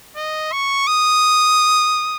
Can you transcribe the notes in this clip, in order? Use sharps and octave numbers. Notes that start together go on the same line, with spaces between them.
D#5
C#6
D#6